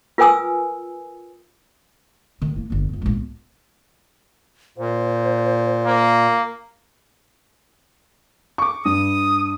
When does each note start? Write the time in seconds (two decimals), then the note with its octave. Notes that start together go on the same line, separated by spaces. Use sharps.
0.18 F4 A#4 B4 G#5 D#6 E6
2.42 G#2 D#3
2.56 A#3 E4
2.70 G1 E2
2.89 F2 D#3
3.02 A#1 G#2
3.13 B3
4.78 A#2 C5
5.86 A#3
8.58 C#6 D6
8.85 G2 D#6